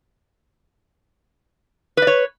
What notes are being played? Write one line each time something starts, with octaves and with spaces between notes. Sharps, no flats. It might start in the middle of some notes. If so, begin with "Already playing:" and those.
B4 C#5 D5